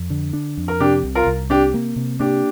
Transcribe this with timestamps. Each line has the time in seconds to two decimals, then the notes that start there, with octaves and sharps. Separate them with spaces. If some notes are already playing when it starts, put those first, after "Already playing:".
Already playing: F2
0.10 D3
0.33 D4
0.57 F2
0.68 A#4
0.80 C3 D4 G4
1.04 C2
1.15 F4 A#4
1.27 C2
1.50 C3 D4 G4
1.74 A#3
1.96 C3
2.19 A#3 D4 G4